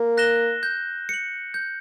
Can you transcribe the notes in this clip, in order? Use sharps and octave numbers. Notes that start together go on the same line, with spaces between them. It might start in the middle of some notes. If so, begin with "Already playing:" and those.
Already playing: A#3
F#6 A#6 E7 G7
G6
C#7 F#7
G6